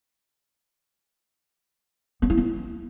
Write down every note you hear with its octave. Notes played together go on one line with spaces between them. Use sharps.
B3
E4
B3